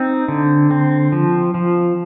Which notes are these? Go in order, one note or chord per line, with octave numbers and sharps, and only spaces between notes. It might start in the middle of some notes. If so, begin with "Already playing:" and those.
Already playing: C4 D#4
D3
C4
F3
F3